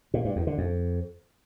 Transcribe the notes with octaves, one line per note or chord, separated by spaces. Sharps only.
A#2
G2
E2
D3
F2